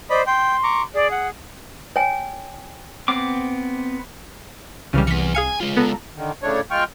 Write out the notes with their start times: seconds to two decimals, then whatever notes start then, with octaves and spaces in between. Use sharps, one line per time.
0.10 C5 D5 D#5 B5
0.27 G5 C6
0.63 A#5 C#6 D6
0.95 G#4 D5
1.11 F#5
1.96 C#5 G5 G#5
3.08 B3 C4 D6
4.93 C2 C#3 E3 G3 F6
5.07 E3 B3 B6 C#7
5.35 G#4 F5 G#5 C#7
5.60 G#3 F4
5.77 B3 A4 A#5
6.14 D3 D#3
6.43 A2 C#3 A3 D4 C#5
6.71 G#3 F4 G5 C#6 F6